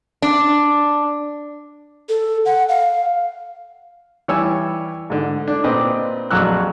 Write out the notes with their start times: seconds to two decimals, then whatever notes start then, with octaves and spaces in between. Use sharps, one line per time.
0.22 D4
2.09 A4
2.45 F#5
2.69 F5
4.28 E3 G3 C#5 G#5 E6
5.10 G#2 D3
5.48 D4
5.64 A#2 C4 B4 D#5 D6
6.31 A#1 F2 F#3 F#4 E6 F#6